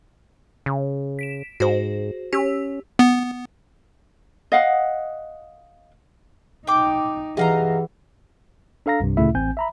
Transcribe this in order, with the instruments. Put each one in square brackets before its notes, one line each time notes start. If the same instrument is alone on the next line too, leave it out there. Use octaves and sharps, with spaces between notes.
[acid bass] C#3
[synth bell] B6 D7 E7
[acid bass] G#2 [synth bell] F#4 G#4 C5
[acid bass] C#4 [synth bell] G4 E6
[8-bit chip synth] B3
[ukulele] D#5 F5 F#5
[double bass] D#4 [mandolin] G5 D6
[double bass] E3 [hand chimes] G4 G#4 F#5 [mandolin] D#5 F5 A#5
[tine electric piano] D4 A4 F5 A#5 A#6
C2 G2 C3
D2 A#2 C#3 A3 E4 E5
A1 C4 G#5 G6
E5 A#5 B5